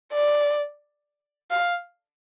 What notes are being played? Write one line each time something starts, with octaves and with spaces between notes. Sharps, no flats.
D5
F5